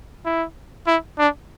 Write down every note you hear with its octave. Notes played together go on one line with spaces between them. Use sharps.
E4
E4
D4